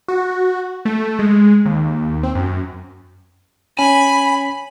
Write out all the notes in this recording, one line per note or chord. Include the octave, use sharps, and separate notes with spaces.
F#4
A3
G#3
D#2
C4
F#2
C#4 G#5 B5